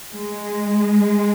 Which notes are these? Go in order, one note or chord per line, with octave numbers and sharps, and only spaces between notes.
G#3